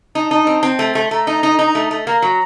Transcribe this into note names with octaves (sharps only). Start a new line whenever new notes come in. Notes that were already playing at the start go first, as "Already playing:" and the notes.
D#4 A5
D#4
C4
C4
A3
A3
A3 A#5
D#4
D#4
D#4
A3
A3
A#3 A#5
F#3